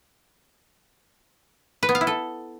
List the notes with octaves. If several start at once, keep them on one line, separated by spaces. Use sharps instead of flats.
B4
B3
F5
E4
A4